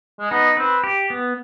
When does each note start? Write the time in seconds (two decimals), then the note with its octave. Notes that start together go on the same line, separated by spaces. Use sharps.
0.20 G#3
0.31 B3 D#4
0.57 C4 B4
0.84 G4
1.10 B3